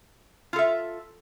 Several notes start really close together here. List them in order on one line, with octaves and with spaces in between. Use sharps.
F4 A4 E5